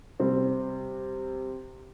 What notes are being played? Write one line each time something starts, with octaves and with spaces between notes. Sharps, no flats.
C3 G3 C4